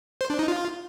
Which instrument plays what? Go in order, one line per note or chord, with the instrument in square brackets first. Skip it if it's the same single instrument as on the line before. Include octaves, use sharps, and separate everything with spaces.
[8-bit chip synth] C5
D4
D#4
F4